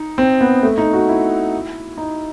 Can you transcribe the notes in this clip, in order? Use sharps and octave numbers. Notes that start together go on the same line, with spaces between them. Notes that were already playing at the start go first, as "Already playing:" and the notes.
Already playing: D#4
C4
B3
A3
D#4
F#4
E4
D#4